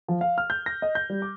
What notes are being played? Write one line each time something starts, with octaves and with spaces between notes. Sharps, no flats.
F3
F5
F6
G6
A#6
D#5
G6
G3
D6